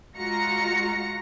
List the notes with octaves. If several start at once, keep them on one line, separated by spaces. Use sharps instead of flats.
G#3 F4 F#4 A#5 A#6 C#7